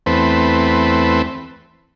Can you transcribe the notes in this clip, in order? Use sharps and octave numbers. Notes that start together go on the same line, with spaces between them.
E2 A3 C4 B4